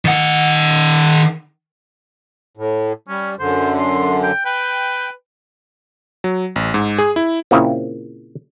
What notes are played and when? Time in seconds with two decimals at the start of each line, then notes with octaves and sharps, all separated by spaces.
0.05 D#3 F#5
2.57 A2
3.08 G3 C#4
3.39 F#2 D3 C5
3.79 C6
4.23 G5
4.45 B4 G5
6.24 F#3
6.56 A1
6.74 G#2
6.99 G#4
7.16 E4
7.51 A#2 C#3 A#3 C4 E4